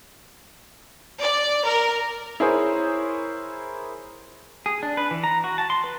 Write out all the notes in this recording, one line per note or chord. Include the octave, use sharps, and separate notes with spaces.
D5
A#4
E4 G#4 A#4 C5 C#5
G#4
D4
B4
E3
A#5
F#4
A5
C6
B4